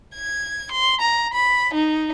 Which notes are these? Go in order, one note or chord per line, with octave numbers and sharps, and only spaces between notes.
G#6
C6
A#5
B5
D#4